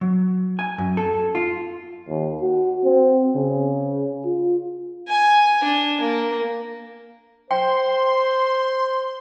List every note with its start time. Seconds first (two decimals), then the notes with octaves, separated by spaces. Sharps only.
0.01 F#3
0.59 G#5
0.78 F#2
0.97 A4
1.35 F4
2.09 D#2
2.41 F#4
2.84 C4
3.35 C#3
4.25 F4
5.09 G#5
5.64 D4
6.01 A#3
7.51 C5 G5 C6